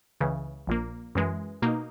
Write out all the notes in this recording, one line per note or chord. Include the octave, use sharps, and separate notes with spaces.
C#2 C#3 E3
A#1 A#2 A#3
F#2 E3 G#3
B2 A#3 D#4